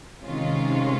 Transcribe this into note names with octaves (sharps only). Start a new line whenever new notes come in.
C3 D#3 G#3 C#4 F4